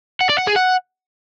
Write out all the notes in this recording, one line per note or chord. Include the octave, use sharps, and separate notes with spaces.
F#5
D5
F#5
G#4
F#5